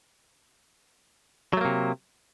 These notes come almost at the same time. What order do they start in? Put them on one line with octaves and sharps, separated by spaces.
F#3 A3 A#3 C3